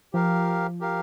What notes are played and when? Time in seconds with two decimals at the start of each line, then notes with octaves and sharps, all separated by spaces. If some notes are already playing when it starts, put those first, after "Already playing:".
0.13 F3 G4 A#4 F5
0.80 G4 A#4 F5